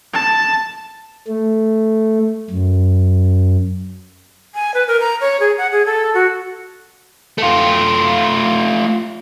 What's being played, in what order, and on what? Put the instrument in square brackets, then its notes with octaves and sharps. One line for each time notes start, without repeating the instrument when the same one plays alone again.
[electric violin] A5
[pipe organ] A3
F#2
[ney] G#5
B4
A#4
A#5
C#5
G#4
F#5
G#4
A4
F#4
[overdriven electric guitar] A3 F4